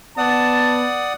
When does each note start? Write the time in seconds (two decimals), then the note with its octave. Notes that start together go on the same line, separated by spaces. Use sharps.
0.18 B3 D5 F#5 A5 D#6